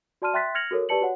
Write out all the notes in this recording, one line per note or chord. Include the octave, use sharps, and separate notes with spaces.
F#4 D5 A5 C6 F6 D#7
E5 G5 C6 F#6 A6 B6
F6 G#6 A#6 C#7 F7 F#7
F#4 A4 A#4 C#5
G4 B4 D5 A5 C#7 F#7
F#4 C#5 F#5